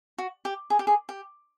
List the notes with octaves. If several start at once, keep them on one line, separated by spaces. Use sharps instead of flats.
F#4
G4
G#4
G4
G#4
G4